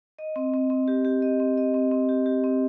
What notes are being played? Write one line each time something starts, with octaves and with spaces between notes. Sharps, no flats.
D#5
C4
C4
C4
G4
G4
D#5
C4
D#5
C4
C4
G4
G4
C4